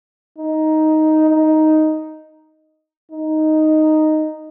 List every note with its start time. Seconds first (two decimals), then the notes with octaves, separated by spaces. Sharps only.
0.38 D#4
1.29 D#4
3.11 D#4